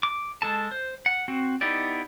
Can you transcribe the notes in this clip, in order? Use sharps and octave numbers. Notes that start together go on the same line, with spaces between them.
D6
G#3 A4 A5
C5
F#5
C4 F#4
B3 D#4 E4 G4 D5